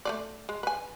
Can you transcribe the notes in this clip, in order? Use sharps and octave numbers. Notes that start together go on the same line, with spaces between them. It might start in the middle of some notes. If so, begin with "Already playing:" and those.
A3 C4 D5
G#3
B4 G#5